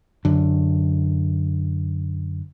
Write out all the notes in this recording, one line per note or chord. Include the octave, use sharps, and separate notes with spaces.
F#2 D3